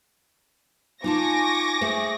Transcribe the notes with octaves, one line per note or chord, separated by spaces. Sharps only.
D#4 F4 G#5 A5 C#6 D6 A#6
A3 G#4 C5